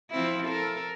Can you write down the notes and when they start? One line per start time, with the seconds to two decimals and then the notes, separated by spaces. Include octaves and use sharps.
0.11 F3 C4 E4
0.48 A4 A#4